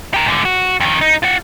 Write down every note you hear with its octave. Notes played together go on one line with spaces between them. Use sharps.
G4 A#4
G#2 D3
F#4
F2 D#3
D#4
F4 F#5